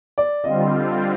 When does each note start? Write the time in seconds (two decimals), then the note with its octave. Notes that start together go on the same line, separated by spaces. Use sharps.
0.18 D5
0.43 D3 G3 C4 F4 D#5